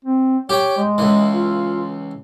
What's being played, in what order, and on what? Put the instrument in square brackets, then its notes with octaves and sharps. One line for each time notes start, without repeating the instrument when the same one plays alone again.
[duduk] C4
[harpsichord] G4 G5 [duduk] C#5
[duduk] G#3
[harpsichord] C#2 E3
[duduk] F4